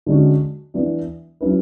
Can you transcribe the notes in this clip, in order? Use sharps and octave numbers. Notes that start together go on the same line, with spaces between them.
D3 G#3 C#4 F#4
E3 B3 D4
F#3 C#4 E4 B4